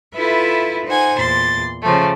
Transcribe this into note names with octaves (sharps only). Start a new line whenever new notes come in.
E4 F4 A4 B4 E5
D#4 C5 F#5 G#5
E2 A#2 C6 A6
C#3 F3 A3